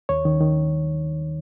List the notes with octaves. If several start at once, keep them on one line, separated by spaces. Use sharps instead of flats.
D#2 C#5
D#3
D#3